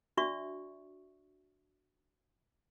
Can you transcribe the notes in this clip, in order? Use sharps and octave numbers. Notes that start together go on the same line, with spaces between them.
D4 F#4 D5 E5 C#6